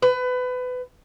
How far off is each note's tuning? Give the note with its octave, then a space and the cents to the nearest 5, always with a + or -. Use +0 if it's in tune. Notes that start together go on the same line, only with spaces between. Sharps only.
B4 +25